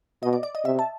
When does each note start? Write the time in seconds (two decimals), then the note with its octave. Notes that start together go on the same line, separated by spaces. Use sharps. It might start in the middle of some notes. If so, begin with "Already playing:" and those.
0.23 B2 D#5
0.33 D5
0.43 D5
0.55 D#5
0.65 C3 E5
0.79 A5